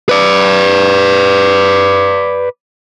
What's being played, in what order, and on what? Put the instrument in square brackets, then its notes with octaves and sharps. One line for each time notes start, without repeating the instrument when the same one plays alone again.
[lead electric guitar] B4 D5